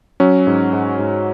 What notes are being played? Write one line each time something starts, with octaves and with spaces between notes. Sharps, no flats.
F#3 C#4
G#2
G#2
G#2